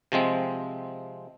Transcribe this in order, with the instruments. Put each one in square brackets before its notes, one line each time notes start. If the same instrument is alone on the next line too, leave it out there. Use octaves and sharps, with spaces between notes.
[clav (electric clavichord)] C3 F3 G#3 C4